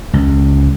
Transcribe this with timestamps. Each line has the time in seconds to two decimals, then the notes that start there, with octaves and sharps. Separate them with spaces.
0.13 C#2